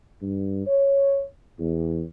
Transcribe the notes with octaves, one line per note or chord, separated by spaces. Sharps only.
G2
C#5
E2